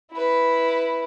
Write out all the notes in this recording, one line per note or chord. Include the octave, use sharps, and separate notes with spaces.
E4 B4